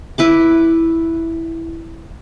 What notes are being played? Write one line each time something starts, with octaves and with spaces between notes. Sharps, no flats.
E4 B4 D6